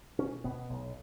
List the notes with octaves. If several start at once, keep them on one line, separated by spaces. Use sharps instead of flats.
B2 C#4
B2 B3
B1